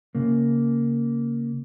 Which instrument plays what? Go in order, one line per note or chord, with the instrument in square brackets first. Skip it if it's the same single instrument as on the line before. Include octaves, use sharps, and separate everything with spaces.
[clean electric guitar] C#3 A#3